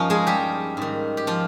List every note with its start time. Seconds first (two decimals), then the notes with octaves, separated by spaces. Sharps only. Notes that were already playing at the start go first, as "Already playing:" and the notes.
Already playing: G2 F3 A#3 C#4 D#4 F4
0.10 G#3 G#4
0.27 G3 G4
0.77 G#2 D#3
1.17 G4
1.27 F3 F4